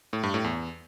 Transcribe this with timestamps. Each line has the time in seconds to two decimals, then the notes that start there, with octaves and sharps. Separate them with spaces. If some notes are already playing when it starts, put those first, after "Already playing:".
0.13 A2
0.23 G2
0.34 A2
0.44 E2